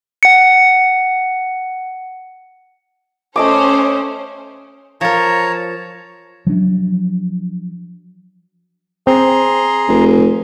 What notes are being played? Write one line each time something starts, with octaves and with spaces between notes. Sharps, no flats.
F#5 C#7
A3 C#4 C5 D#5 D6
F3 A#4 C#5 A5 A#5
F3 F#3 D4
C4 G#4 A#5 C6
F1